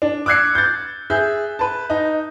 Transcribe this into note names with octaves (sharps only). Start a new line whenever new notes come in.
D4
D6 E6 F#6 G#6 C7 C#7
G6 A6
G#4 E5 G6
B4 A5
D#4